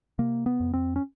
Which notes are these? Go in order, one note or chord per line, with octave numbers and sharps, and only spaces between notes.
C3 A#3
B3
F2
C4
C#4